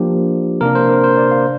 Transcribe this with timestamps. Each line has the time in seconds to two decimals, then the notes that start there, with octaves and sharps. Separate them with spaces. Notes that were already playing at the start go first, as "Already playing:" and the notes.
Already playing: F3 A#3 D4 G4
0.61 C3 A#3 D4 A#4
0.75 C5
0.89 A#4
1.04 C5
1.17 D5
1.31 F5